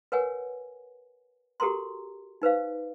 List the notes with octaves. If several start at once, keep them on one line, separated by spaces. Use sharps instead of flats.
A#4 B4 C#5 F#5 G#5
F#4 G4 A4 A#4 A#5 C6
D#4 B4 C5 F5